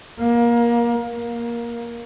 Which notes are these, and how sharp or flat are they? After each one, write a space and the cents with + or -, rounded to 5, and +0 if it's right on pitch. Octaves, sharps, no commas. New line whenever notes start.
A#3 +25
A#3 +15